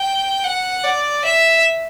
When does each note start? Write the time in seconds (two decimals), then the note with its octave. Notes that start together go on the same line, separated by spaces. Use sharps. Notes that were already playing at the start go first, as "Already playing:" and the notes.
Already playing: G5
0.44 F#5
0.84 D5
1.25 E5